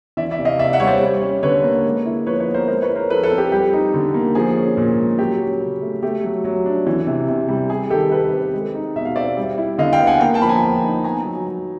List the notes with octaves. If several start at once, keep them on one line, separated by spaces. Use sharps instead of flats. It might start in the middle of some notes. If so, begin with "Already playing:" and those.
E3 D5 E5
D5 E5
C3
D#5 F5
C3 D5 E5
E5 F#5
G3 C#5
C5 D5
G3
C#4
D3 B4 C#5
A#3
G#3
E4
F3 B4 C#5
B4 C#5
B3
A#4 C5
G#3 A#4 C5
B4 C#5
E4
A#4 C5
F3 A4 B4
A4 B4
C4
G4
G3 G4
D#4
D3
A#3
F3 G#4
C#4
A#2
G#3
F#3 G4
C#4
C#3
A3
A3 G4
F#3
F#3
D4
E3
C3
C3
G3
G3 G#4
D#3 G4 A4
D#3 A4 B4
C4
G#3
D#4
B2 E5
F5
C4 D5 E5
G3
E4
D3 D#5 F5
F5 G5
B3
F#5 G#5
A#3 F5 G5
G5 A5
F3 B5
G#5 A#5
F3
D#4
B3 G#5 A#5
F#3
F#3